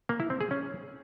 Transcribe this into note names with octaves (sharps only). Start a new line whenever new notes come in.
A#3
E4
C4
G#4
C#4